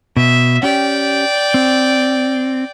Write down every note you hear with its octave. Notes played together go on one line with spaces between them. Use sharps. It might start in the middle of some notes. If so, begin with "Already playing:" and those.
B2 E5
C#4 G4 D5 G5
C4